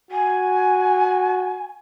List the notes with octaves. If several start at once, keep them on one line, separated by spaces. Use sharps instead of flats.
F#4 G#5